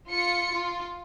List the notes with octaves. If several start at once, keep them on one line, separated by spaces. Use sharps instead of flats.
F4 C#7
F4